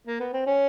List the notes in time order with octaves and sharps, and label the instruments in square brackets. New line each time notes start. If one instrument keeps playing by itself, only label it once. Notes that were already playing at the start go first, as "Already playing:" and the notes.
[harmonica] A#3
B3
C4
C#4